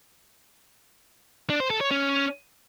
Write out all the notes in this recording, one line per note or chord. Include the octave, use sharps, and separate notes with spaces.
D4
C5
A4
C#5
C#4